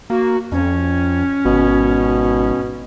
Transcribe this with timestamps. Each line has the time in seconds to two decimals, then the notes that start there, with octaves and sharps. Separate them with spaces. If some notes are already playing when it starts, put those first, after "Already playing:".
0.10 A#3 F#4
0.52 F2 C#4
1.45 G#1 B2